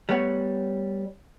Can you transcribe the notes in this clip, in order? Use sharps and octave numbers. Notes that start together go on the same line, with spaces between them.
G3 A3 B3 C#5 F#5